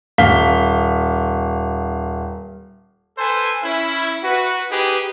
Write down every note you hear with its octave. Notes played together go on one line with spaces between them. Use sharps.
D#1 F5 B6 G7
A4 B4 C5 G#5
C#4 E4
F#4 B4
D#4 G4 G#4 B4